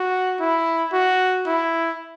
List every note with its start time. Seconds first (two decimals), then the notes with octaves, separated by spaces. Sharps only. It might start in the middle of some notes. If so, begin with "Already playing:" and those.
Already playing: F#4
0.40 E4
0.93 F#4
1.46 E4